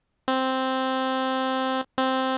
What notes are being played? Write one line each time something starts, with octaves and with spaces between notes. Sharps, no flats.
C4
C4